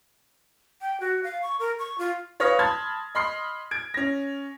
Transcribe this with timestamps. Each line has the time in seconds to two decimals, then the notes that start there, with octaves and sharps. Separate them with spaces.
0.81 G5
1.00 F#4
1.23 F5
1.42 C#6
1.59 A#4
1.79 C#6
1.98 F4
2.40 B4 C#5 F5 D#6 F6 A#6
2.59 A5 B5 C6 F6 G#6 A6
3.15 D#5 B5 C6 F6 C7
3.71 G#6 D7
3.94 C#4 A#6